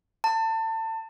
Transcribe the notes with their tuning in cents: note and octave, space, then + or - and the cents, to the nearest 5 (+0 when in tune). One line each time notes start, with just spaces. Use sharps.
A5 +30